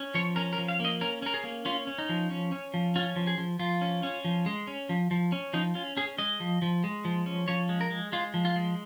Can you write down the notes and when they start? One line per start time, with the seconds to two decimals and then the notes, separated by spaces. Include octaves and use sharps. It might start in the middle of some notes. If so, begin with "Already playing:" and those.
Already playing: C#4
0.14 F3 C#5
0.36 C#4 A#4
0.53 A#4
0.58 F3
0.68 F5
0.80 A#3 D#5
1.01 C#4 A#4
1.22 C#4 A#4
1.34 G#4
1.44 A#3
1.65 C#4 F4
1.87 C#4
1.98 D#4
2.09 F3
2.30 C#4
2.52 C#4
2.74 F3
2.96 C#4 F4
3.16 F3
3.27 G#4
3.38 F3
3.59 F3 F4
3.81 C#4
4.03 C#4
4.24 F3
4.46 G#3
4.67 C#4
4.89 F3
5.11 F3
5.32 C#4
5.53 F3 D#4
5.75 C#4 F4
5.97 C#4 G#4
6.18 G#3 D#5
6.40 F3
6.62 F3
6.84 G#3
7.05 F3
7.26 C#4
7.48 F3 C#5
7.69 G#3
7.81 A#4
7.91 G#3
8.12 G#3 F4
8.34 F3
8.45 F4
8.56 G#3